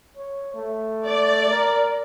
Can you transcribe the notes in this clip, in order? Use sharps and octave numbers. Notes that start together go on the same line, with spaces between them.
C#5
A3
D5
A#4